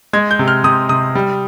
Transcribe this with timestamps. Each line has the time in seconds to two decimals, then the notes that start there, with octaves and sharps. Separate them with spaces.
0.13 G#3 G#6
0.31 G6
0.39 C3
0.48 F6
0.64 C3 D#6
0.89 C3 D#6
1.15 G3